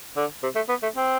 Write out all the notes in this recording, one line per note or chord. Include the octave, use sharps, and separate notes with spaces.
D3
C3
A3
B3
A3
C4